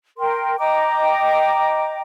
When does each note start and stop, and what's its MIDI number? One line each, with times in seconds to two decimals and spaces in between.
0.19 0.56 70
0.19 0.56 79
0.19 0.56 84
0.58 2.01 75
0.58 2.01 79
0.58 2.01 82
0.58 2.01 86